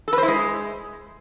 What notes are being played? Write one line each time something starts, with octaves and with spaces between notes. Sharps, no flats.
A4
B4
C5
E4
G#3